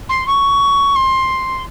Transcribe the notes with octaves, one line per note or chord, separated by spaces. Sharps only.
C6
C#6
C6